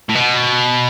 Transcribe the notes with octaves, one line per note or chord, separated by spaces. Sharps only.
A2
B2